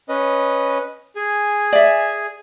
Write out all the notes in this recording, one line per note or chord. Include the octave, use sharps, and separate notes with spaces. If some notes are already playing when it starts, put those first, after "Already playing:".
C#4 B4 D#5
G#4 G#5
D5 E5